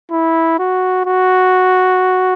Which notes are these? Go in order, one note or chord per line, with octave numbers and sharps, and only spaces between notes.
E4
F#4
F#4